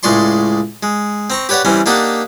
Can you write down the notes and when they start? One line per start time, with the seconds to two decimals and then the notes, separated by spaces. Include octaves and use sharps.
0.03 C#2 A2 G#3 D5 C6 C#6
0.83 G#3
1.30 C4 A#5 C#6
1.49 G4 B4 C#5 D5 F#5
1.65 E3 G3 C4 C#4
1.86 A#3 D4 D#4 G4 D5 F#5